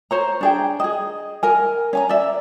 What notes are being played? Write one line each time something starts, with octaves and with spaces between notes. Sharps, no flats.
C5 C#5 A#5
D4 G#4 G5
G#4 D#5
A#4 G#5
C#4 G#5 A#5
D5 E5